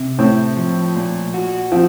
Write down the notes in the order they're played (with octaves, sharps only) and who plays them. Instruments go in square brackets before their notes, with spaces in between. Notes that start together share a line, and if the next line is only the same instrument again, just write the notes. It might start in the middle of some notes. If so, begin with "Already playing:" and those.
Already playing: [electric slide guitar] C3
[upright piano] A2 [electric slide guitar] C4
[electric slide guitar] F3
A#2
F#4
[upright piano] F3 [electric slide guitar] C4